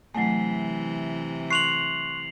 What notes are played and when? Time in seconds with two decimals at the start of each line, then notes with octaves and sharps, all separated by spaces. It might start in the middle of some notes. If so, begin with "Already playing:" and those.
0.15 C3 E3 F#3 A3 G#5 C7
1.51 C6 C#6 F#6 C7 F7 F#7